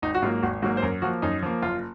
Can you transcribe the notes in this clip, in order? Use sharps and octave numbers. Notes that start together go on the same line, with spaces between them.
G#1 D#4
F#4
G#2 F#3 A#3 F4
G#1 F#4
G#2 F#3 A#3 F#4
C5
F#2 A#4
F3 A#3 F#4
F#2 D#4
F3 A#3
F#1 F4